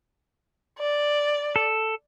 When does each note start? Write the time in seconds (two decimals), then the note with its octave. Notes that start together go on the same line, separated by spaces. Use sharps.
0.78 D5
1.56 A4